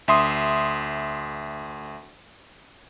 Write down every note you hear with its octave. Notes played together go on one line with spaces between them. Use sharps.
D2 E5 C6 D#6